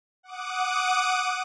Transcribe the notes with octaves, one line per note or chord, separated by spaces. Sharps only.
F#5 D6 D#6